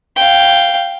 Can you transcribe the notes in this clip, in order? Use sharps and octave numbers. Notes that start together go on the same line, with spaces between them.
F5 G5